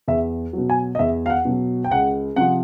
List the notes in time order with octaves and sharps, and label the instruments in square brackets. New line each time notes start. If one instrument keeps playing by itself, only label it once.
[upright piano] E2 E5
B2 F#3
G#5
D#5
E2 E5
F5
F#5
B2 F#3
G5
C#2 F#5
C3 F3 F#5